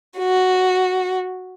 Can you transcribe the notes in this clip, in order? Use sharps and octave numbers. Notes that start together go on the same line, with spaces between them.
F#4